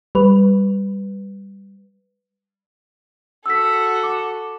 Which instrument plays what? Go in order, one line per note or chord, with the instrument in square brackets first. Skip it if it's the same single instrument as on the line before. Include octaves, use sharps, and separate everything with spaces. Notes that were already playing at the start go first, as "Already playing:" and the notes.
[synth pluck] G3 B4
[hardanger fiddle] F#4 A4 [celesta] E6 B6
[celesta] D6